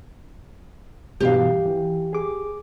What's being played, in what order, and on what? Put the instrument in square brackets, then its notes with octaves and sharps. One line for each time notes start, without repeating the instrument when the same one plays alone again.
[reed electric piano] G2 B2 E3 [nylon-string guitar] G4 F5
[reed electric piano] E3
G#4 D6